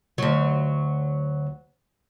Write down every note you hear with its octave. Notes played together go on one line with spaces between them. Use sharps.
D2 F#3